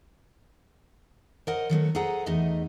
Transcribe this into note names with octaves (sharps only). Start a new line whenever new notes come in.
A#4 C5 C#5 D#5 F#5
D#3 F#3 A3 B3
G#4 A4 C5 D#5 F#5 A#5
E2 A3 D#4 D#5 E5